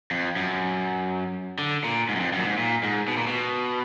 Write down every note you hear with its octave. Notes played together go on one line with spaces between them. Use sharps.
F2
F#2
D3
A#2
G#2
F#2
F2
F#2
A#2
G#2
A#2
G#2
B2
A#2
B2